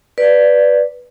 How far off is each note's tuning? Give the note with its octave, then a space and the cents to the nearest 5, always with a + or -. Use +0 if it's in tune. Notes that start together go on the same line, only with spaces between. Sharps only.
B4 +0 D5 +0